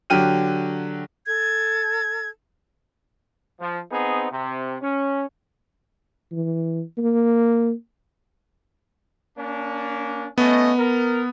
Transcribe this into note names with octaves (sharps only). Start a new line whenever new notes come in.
D3 F#3 G4 G5 F6 D#7
A4 G#6
F3
B3 C4 D#4 G#4
C3
C#4
E3
A#3
A#3 C#4 D4
A3 B3 C#4 D#5
A#4